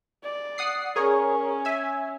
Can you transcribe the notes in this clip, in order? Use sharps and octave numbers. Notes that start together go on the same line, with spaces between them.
D5
F#5 D#6 C7
C#4 G#4 A#4 C#5
E5 G#5